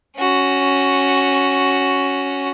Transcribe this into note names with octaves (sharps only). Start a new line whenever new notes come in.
C#4 F#4